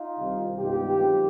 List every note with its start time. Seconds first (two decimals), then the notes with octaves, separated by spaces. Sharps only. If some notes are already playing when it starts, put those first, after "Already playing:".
Already playing: D#4 F4
0.17 C2 C3 D#3 G3
0.58 G2 D#3 G#3 B3 F4 G4
0.99 F#2 D#3 G#3 C4